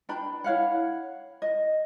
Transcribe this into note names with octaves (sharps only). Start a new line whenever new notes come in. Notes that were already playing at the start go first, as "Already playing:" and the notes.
D4 B4 G5 B5
E4 C#5 F5 F#5
D#5